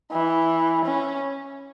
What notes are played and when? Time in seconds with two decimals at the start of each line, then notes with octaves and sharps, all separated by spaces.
0.12 E3
0.85 C#4